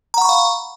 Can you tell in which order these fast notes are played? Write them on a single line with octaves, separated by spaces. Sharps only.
A#5 F#5 C#6 B5 F5